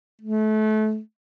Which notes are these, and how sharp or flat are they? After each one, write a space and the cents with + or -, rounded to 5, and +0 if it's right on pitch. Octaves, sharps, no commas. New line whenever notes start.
A3 -30